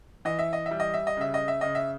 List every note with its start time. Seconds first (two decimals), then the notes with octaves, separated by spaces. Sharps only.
0.25 E3 D#5
0.39 E5
0.53 D#5
0.66 E5
0.71 G3
0.80 D#5
0.94 E5
1.07 D#5
1.17 C#3 E5
1.34 D#5
1.48 E5
1.61 C#3 D#5
1.75 E5